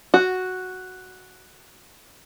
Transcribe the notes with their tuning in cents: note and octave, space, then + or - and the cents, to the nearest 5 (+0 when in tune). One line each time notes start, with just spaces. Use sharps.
F#4 +0